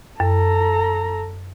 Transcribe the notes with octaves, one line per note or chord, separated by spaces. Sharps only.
F#2 A4 A#5